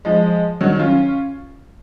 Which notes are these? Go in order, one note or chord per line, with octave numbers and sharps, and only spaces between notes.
F3 G#3
D#3 F#3
C#4 F4